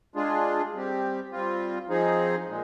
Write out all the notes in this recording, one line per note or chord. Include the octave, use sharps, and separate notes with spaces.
G#3 D4 F4 G#4
G3 C4 G4
G3 C4 F4
F3 C4 D#4 G#4
A#2 G#3